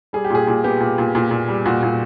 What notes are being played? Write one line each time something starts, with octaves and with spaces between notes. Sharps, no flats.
G3 G#4
G4
A#2 G#4
A#2
B3 G4
A#2
A#2
A#2
A#2
G3
A#2 F#4
A#2